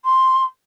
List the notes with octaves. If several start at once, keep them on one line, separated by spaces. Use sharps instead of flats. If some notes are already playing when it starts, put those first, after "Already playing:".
C6